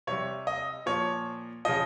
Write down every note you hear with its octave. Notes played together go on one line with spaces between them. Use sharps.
C3 G3 C#5
D#5
A#2 F3 C#5
C#3 F3 D#5